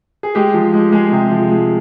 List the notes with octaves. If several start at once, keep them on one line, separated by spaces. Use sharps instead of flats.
G#4
G#3 G4
F3
G#3
G#3 G#4
C3
F3
G#3